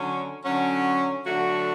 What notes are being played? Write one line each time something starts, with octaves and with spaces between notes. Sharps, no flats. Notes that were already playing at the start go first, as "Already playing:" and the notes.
Already playing: D3 F#3 C#4
D3 F#3 C#4
D3 F#3 A3 D4 F#4